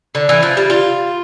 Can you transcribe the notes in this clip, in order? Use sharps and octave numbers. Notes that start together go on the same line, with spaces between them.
D3
E3
F3
G3
F4